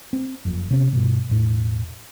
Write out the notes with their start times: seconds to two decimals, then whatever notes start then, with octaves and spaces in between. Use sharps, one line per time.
0.13 C4
0.45 F#1 F2
0.71 C3 B3 C#4
0.93 G2 B2
1.29 E1 A2